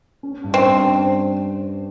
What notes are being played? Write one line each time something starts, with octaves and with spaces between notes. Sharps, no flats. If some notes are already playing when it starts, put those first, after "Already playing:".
C#4
G2
C4
G2